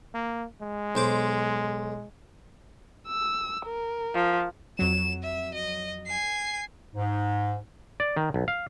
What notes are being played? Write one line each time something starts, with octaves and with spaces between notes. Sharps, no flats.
A#3
G#3
B1 C5 D6
E6
A#4
F3
F2 F#3 E7
E5
D#5
G#5 C7
G#2
D5
D#3
B1
F5